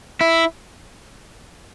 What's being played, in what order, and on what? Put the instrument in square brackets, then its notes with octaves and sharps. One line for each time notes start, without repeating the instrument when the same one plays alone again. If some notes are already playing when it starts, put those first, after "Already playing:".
[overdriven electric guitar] E4